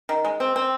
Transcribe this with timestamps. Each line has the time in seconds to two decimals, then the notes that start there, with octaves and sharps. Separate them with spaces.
0.09 D#3
0.25 G#3
0.40 C4
0.56 C4